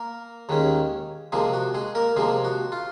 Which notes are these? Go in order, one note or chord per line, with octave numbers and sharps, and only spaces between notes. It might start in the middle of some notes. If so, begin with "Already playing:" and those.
Already playing: A#3 A#4
D#2 D#3 G#3 C#4
C3 F3 G#3 A#3 G#4
F#4
G#3 G#4
A#3 A#4
C3 F3 G#3 A#3 G#4
F#4
F4